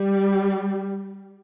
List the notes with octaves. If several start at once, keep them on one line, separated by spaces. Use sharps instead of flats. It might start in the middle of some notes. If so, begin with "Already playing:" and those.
Already playing: G3